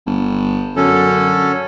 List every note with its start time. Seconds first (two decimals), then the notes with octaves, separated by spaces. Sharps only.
0.06 G1
0.77 F#2 D3 C#4 A4